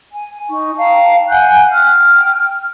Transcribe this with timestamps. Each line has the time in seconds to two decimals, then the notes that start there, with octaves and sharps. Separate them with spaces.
0.12 G#5
0.49 D#4 C#6
0.77 F5 G5 A5 A#5
1.29 F#5 G#5 F#6 G6
1.72 G5 F6